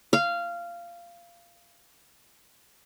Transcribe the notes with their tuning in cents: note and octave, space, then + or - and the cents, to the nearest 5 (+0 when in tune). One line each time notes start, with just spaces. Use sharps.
F5 -15